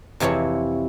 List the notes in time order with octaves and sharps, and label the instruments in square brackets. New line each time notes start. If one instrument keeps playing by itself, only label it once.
[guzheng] F2 C3 E3 E4 C#5